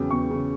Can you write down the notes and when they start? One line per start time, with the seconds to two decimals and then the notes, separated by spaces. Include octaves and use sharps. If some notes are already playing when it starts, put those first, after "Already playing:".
Already playing: E2 C#3 F#3 G5
0.11 E2 C#6
0.30 C#3